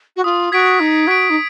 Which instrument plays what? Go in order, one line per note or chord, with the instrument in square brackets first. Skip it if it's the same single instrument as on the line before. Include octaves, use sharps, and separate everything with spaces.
[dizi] F#4
[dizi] F4 [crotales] D#6
[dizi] F#4 [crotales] G#6 B6 D7
[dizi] D#4 [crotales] D#6
[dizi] F#4 [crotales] G#6 B6 D7
[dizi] D#4